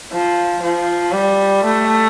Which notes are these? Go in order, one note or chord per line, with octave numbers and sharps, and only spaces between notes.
F3
F3
G3
A3